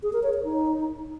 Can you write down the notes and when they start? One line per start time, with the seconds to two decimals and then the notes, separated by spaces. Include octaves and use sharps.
0.03 G#4
0.13 A#4
0.23 C#5
0.34 C#5
0.44 D#4